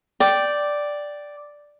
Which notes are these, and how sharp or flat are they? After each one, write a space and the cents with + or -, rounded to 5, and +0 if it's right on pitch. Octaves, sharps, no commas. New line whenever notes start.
D5 +0 G5 -10